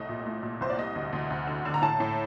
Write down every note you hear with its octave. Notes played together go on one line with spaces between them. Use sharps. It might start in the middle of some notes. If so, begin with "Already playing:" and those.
Already playing: C2 A2 A3 D#5
A#2
A3
A#2
C2 C5
D5
G3 D#5
D2
D2
D2
D3
D3
A#5
A2 A5
A2